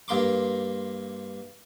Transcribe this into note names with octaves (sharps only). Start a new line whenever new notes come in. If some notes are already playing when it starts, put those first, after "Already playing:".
G2 A#3 C6 D6